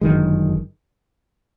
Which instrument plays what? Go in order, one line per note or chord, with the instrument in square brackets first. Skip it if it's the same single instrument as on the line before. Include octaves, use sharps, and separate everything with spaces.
[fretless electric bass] G1 F#2 D#3 G#3